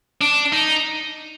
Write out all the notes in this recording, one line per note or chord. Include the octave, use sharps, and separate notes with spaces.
D4
D#4